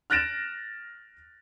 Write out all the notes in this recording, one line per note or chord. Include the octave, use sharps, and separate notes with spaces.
F6 F#6 A6 A#6 D7 E7